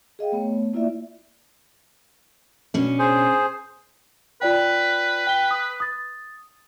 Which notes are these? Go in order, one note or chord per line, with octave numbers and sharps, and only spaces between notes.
G#4 D#5 F5 G5
A3 B3 C#5
A#3 E4 F4 D5 E5
B2 C#4 D4
G#4 C5
F4 B4 D5 G5
G5 G7
D#6
D#6 A6